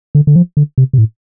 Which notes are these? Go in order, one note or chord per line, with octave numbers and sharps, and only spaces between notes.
D3
D3
F3
D3
C3
C3
A2